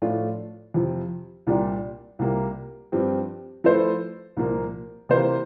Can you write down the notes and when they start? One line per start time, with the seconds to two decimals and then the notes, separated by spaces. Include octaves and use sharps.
0.02 A2 F3 A3 D4 F4
0.74 F2 C3 F3
1.47 C2 A#2 G3 D4 G4
2.19 C2 C3 G3 A#3 F4
2.92 G2 F3 C4 G4
3.64 F3 A3 E4 A4 C5
4.37 C2 A#2 F3 A#3
5.09 C3 E3 A#3 F4 C5